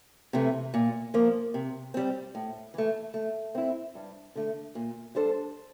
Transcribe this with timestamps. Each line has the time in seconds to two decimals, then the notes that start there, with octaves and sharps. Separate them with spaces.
0.33 C3 E3 A3
0.74 A#2
1.14 F3 A#3
1.54 C3
1.94 G3 C4
2.35 A2
2.74 E3 A3
3.14 A3
3.55 C4 E4
3.95 G2
4.35 D3 A3
4.75 A#2
5.15 G3 D4 A4 C5